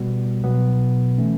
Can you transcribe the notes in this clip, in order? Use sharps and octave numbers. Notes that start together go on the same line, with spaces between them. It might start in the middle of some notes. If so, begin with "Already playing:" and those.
Already playing: B2 G3 B3 F#4
B2 F#3 B3
E3 A3 C#4